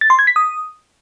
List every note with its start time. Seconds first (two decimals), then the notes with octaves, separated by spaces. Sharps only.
0.01 A6
0.10 C6
0.19 G#6
0.27 B6
0.36 D#6